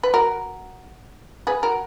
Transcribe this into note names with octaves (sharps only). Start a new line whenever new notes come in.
B4
F#4 A#4
G#4 B4
F#4 A#4